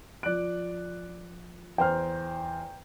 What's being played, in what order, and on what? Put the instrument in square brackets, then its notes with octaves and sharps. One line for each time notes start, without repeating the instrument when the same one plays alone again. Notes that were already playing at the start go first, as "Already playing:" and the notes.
[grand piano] F3 D7 [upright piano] D5 F#6
[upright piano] E2 C5 F6 [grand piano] G5 A#5